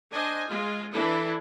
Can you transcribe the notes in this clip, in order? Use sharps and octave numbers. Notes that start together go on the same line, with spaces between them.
D4 C5 D#5 G#5
G#3 F4
E3 D4 E4 A4